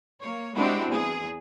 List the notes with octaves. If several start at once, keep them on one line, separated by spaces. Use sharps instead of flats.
A#3 C#5
G#3 C4 D4 E4 F#4 G4
E2 G#4